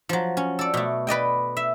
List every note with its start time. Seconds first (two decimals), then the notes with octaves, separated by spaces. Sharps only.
0.09 F3 F#3
0.37 C#4
0.59 A4 D5
0.74 B2 A3
1.07 B4 D5 D#5 G5
1.57 E5